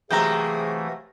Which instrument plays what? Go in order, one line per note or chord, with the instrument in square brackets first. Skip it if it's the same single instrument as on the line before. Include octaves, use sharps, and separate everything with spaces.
[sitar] C3 F#3 A#3 [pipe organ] E3 A3 [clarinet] G#4 [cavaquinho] G5 A#5